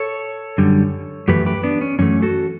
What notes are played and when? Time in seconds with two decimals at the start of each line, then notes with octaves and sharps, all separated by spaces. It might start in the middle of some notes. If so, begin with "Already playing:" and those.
Already playing: A4 C#5
0.58 F#2 D3 G3
1.28 F#2 E3 A3 G4 B4
1.46 G4 B4
1.63 B3 D4
1.81 C#4
1.99 F#2 E3 A3 C#4
2.22 F#4 A4